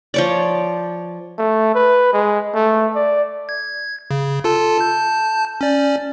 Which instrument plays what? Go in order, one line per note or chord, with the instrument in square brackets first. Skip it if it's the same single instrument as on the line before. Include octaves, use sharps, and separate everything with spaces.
[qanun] F3 C#5 D5
[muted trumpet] A3
B4
G#3
A3
D5
[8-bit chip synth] G#6
C#3
F4 A4 A5
A5 G6
C#4 D5